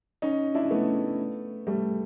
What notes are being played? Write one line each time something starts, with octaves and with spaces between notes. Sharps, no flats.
C#4 D#4
D4 E4
A3 B3
G3 A3